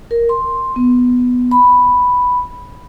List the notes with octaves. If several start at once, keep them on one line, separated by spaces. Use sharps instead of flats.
A#4
C6
B3
B5